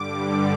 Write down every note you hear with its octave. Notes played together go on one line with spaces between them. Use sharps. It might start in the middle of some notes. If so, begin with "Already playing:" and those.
Already playing: G2 D3 G3 D6